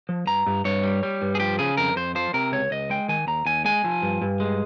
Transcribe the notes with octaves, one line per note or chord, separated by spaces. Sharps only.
F3
G2 A#5
G2
G2 C#5
G3
G3
G2
G#4
F3 G4
C#3 G#4
F2 A#4
F2 C5
F3 C5
C3 A#4
C#2 C#5
C#2 D#5
G#3 G5
D#3 G#5
D#2 A#5
D#2 G#5
G#3 G#5
F3
G2
G2
G#3